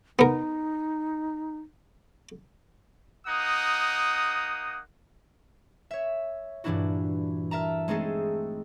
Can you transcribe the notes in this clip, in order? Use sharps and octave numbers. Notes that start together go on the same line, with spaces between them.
B3 D#4 A#4
A#3 D#4 F#5 D#6
C#5 E5
G2 A#2 E3 D4 E4 F#4
A#4 E5 A5 A#5
G#3 A3 C4 D#4 G#4 A4